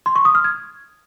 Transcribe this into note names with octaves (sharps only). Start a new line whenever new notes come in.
C6
C#6
D#6
F6
G#6